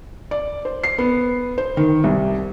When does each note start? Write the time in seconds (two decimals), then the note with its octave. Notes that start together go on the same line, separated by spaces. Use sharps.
0.31 D5
0.65 C5
0.83 C7
0.98 B3
1.58 C5
1.77 D#3
2.04 C2